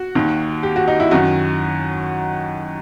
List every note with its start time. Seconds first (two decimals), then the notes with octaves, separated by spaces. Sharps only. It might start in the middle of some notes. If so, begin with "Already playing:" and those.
Already playing: F#4
0.15 D#2 D#3
0.63 G4
0.76 F#4
0.88 D#4
1.00 E4
1.11 F#2 D#3 F#4